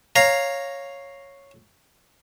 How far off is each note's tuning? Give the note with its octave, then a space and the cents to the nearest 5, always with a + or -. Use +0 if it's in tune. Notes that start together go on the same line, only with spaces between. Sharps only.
C#5 -5 F5 +0 A#5 +0